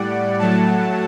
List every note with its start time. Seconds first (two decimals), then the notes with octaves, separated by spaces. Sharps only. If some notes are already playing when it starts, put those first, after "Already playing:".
Already playing: A2 G3 D5 F#5
0.39 A2 F#3 A3 F#5 A5